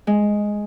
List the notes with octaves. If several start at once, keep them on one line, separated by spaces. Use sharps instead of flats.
G#3